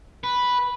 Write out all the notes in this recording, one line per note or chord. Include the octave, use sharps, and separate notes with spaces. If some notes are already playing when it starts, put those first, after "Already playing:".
B4